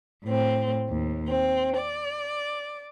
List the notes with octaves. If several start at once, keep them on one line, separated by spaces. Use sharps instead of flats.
A2 C4
D#2
C4
D5